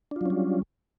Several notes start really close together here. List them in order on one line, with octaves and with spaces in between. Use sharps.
D4 F4 F#3 C#4 G3